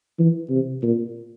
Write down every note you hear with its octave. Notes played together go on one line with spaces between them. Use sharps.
E3
C3
A#2